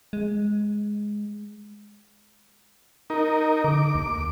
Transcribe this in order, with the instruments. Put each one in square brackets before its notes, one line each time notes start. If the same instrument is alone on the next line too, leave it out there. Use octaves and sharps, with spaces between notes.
[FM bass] G#3
[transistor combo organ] D#4 A#4
[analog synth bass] D3 [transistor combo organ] D6
[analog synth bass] D#2